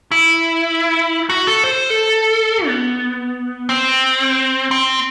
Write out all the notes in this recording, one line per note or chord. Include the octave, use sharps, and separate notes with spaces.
E4
F#4
A4
C5
A4
B3
C4
C4